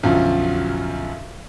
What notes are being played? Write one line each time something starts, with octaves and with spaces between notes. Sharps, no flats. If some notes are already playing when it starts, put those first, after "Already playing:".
B1 F#2 D3 F3